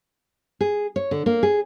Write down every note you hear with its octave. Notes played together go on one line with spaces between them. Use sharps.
G#4
C#5
D3
A#3
G#4